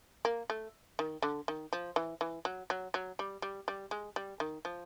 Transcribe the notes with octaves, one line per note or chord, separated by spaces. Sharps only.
A#3
A3
D#3
D3
D#3
F3
E3
E3
F#3
F#3
F#3
G3
G3
G3
G#3
G3
D#3
F3